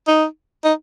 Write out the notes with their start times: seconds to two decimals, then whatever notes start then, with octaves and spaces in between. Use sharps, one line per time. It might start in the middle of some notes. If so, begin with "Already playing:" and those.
0.07 D#4
0.64 D#4